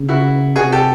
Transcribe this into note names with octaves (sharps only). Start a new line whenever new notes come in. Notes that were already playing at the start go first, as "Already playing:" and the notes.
Already playing: C#3
E4 F#4
C3 F#4 G#4
G4 A4